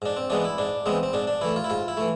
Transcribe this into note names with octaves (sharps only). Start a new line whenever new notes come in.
G#2 D4
C4
E3 G#3 B3 D4
E4
G#2 D4
E3 G#3 B3 C4
C4
G#2 D4
D4
E3 A3 E4
F4
E4
G#2 F4
E4
E3 A3